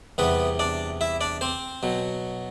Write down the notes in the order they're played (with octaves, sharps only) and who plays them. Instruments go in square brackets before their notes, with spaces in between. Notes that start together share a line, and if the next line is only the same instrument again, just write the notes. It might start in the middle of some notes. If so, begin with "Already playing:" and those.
[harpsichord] E2 C3 G3 B3 B4
D4 D5
E4 E5
D4 D5
C4 C5
B2 F#3